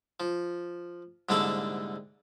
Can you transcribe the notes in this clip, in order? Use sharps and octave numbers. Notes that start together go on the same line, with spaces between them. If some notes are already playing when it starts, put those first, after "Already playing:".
F3
C2 G#2 D3 A#3 D4 A4